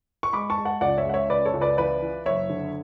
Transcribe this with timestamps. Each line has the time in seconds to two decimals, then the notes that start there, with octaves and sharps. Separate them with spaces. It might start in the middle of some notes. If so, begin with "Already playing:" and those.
0.23 C#6
0.33 G#3 B5 D6
0.50 A5 C#6
0.58 G#3
0.65 F#5 A5
0.81 C#2 D5 F#5
0.98 C#5 E5
1.05 G#3 F#5
1.14 C#5 E5
1.30 C#3 B4 D5
1.45 A4 C#5
1.53 C#2
1.61 B4 D5
1.78 E3 B4 D5
2.02 E3
2.25 F#1 C#5 E5
2.50 D3